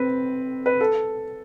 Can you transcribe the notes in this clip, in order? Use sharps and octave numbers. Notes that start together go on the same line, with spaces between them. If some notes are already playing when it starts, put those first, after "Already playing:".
Already playing: C4 B4
B4
A4